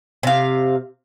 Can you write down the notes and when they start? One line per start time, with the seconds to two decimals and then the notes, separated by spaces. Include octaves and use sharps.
0.23 C3 F5